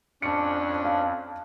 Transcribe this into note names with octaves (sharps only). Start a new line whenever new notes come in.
F2 C#4 D4 A5 C#7
F5 A5